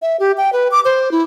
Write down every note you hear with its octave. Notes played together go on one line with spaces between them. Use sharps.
E5
G4
G5
B4
D6
C5
E4